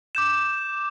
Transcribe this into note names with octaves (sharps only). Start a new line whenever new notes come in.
D6 G6 E7